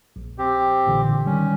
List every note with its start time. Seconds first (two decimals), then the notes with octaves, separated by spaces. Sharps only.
0.16 A#1
0.38 C4 G4
0.87 A#2 D3 E3
1.26 D#3 G3 C#4